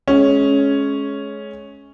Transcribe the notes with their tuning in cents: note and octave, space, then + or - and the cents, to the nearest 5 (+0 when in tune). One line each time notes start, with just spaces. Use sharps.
G#3 +30 C#4 +0